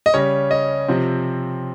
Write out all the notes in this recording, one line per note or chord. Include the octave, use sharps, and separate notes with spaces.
D#5
C#3 G3 C#4 C#5
D#5
C3 F3 C4